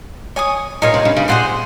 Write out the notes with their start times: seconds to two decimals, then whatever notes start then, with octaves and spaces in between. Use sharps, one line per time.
0.36 C#5 G#5 D#6
0.82 A#2 D#4 A#4 C#5 F5
0.94 C3
1.05 C#3
1.17 C#3
1.28 A#2 G#4 C5 F#5 C6